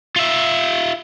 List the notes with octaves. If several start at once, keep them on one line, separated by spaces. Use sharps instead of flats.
F4 E5